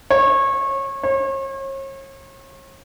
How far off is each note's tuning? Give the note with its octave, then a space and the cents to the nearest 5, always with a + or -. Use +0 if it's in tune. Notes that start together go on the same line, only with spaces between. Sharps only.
C#5 -25
C#5 -40